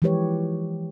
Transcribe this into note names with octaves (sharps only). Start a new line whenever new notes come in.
E3 F3 G#3 G4 B4 C#5